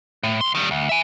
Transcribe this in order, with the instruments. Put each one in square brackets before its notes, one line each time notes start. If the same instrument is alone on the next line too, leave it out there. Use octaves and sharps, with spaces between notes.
[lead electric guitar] A2
C2 C6
D#3 G3
D2
E5 G#5